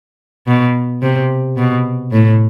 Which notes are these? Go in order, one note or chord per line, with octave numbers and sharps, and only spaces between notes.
B2
C3
B2
A2